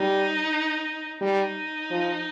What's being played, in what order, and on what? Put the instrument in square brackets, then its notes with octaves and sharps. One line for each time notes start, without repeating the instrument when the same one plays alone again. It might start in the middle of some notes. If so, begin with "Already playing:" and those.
Already playing: [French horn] G3 [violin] D#4
[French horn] G3 [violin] D#4
[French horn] F3